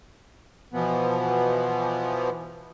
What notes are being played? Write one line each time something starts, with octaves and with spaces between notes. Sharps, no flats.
B2 E3 F3 B3